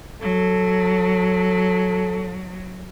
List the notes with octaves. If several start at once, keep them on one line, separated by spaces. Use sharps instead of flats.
F#3 A4